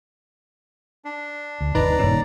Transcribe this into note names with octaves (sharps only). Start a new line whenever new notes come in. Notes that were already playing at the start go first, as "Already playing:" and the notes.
D4
D2
G1 D#2 C3 D#4 B4 D5 A#5
E1 G2 A#2 D#3 C#4